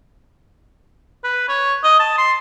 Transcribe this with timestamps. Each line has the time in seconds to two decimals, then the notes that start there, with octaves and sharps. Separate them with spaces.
1.24 B4
1.49 C#5
1.83 D#5
2.00 A5
2.18 C6